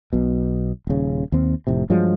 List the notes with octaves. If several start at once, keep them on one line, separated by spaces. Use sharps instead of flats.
B1 B2
D#1 C#3
D#2 C4
F1 A2 C3
G2 F3 F#3 G#3